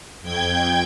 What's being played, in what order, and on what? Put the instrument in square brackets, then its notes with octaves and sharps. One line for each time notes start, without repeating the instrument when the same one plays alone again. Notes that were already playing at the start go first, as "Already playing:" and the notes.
[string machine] F2 G5 G6 G#6